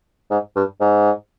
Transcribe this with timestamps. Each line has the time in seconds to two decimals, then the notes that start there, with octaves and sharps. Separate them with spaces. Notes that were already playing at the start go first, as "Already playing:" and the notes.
0.31 G#2
0.56 G2
0.81 G#2